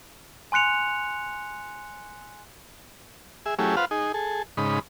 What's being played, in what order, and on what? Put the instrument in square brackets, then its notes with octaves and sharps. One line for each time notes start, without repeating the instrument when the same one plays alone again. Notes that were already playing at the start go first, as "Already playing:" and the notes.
[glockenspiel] G#5 C6 F#6 C#7 F7
[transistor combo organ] G#4 E5
F#3 A3 C#4 E4 G4 G#4
F4 B4 C5 F5 F#5
D#4 G#4
G#4 A4
G#2 C#3 D#4 B5